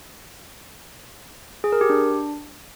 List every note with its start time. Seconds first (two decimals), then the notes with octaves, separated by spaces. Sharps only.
1.64 G#4
1.72 A#4
1.81 G4
1.90 D4